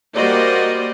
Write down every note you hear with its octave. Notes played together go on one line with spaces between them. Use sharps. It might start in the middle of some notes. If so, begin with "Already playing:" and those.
G3 A#3 F#4 C5 D5 D#5